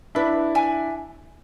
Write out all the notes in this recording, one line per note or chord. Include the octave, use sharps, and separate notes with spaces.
D4 E4 B4
E5 G#5